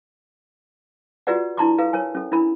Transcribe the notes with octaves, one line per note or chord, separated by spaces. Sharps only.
F4 F#4 G#4 B4 D5 F#5
D4 E4 A5 A#5 C6 D6
G#4 A4 B4 F5
A#4 C#5 G#5
C#4 A4
D4 E4 A#4 B5